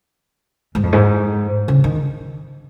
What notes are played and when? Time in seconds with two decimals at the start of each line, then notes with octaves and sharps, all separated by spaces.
0.75 G#2
0.83 F2
0.93 G#2
1.68 C#3
1.84 D#3